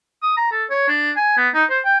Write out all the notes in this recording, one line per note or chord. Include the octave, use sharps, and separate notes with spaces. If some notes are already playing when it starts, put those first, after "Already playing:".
D#6
A#5
A4
C#5
D4
G#5
B3
D#4
C5
G5